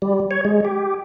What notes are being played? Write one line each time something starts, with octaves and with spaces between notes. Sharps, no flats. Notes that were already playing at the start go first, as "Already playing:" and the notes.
G3
C#5
G#3
G4